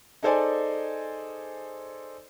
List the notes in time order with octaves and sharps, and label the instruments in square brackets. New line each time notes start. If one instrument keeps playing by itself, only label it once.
[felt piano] D#4 G#4 A4 C5 D5 G#5